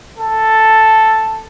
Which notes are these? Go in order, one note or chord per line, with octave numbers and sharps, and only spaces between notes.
A4